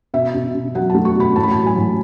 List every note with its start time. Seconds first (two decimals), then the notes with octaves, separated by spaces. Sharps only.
0.14 B2 E5
0.34 B2
0.55 B2
0.75 F#3 F#5
0.90 A5
0.94 A3
1.05 C#6
1.15 B2 B5
1.36 A2 A5
1.43 B5
1.51 A5
1.56 F#3
1.66 G#5
1.77 A2